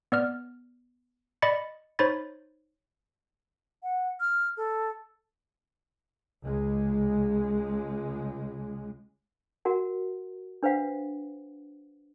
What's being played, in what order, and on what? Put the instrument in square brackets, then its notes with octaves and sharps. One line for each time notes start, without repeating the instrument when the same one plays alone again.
[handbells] B3 D5 F6
D5 D#5 B5 A6 C#7
D#4 C5 C#5 B5 A6
[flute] F#5
F6
A4
[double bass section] C#2 G#3
[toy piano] F#4 A#4 F#5
D4 B4 C5 F5 F#5